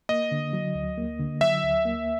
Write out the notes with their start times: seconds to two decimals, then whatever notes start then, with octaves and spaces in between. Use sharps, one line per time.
0.09 A#3 D#5
0.32 D3
0.53 F#3
0.75 D2
0.98 A#3
1.19 D3
1.41 F#3 E5
1.64 D2
1.85 A#3